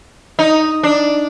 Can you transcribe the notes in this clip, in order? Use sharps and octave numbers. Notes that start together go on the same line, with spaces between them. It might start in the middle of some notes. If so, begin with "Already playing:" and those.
D#4
D4